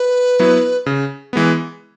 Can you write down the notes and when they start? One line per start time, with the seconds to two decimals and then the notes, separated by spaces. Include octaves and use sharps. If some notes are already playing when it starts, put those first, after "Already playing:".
Already playing: B4
0.39 F#3 B3 E4
0.86 C#3
1.33 E3 G#3 B3